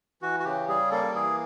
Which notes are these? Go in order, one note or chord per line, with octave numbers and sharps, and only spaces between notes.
E3 F#4
F#4
C#3 G4
G3 G#4
A#3 A4
E3 G#4